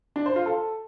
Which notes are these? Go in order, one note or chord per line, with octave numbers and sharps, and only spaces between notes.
D4
C5
F4
A4